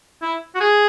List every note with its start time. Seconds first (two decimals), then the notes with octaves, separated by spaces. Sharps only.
0.22 E4
0.55 F#4
0.60 G#4